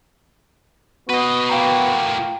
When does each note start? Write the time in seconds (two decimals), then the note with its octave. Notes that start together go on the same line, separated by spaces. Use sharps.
1.09 B3 F#4 B4 D#5
1.49 A2 A#3 F5 G5 A#5